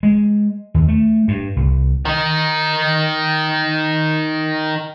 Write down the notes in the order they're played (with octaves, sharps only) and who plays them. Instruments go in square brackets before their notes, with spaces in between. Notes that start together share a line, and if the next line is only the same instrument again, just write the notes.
[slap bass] G#3
D#2
A3
G2
C2
[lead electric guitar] D#3 D#4